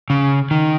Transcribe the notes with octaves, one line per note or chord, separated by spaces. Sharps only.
C#3
D#3